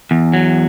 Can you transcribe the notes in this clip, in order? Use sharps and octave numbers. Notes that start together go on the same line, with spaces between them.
E2
F#3